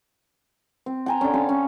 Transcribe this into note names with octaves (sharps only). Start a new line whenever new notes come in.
C4
G5 G#5 A#5
D3 C#4
C#4 A4 F5
C#4